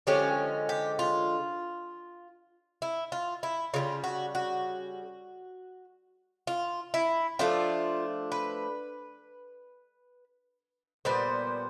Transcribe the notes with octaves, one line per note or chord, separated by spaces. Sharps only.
D3 F3 G#3 C#4 G4
G4
F4
E4
F4
E4
C#3 E3 G3 F4
F#4
F#4
F4
E4
F3 A3 D4 F4
B4
A#2 G3 B3 C5